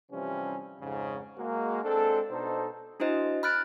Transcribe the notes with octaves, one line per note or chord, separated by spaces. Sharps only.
C3 E3 F3 G3 C4 C#4
F2 G#2 C#3
G#3 A#3 F#4
G#3 C4 D4 A4
B2 D4 D#4 A4 C5
D4 E4 F#4 C5 D#5
B5 F6 F#6 A6 D7